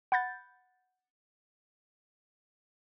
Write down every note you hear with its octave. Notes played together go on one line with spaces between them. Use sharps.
F#5 B5 G6 A6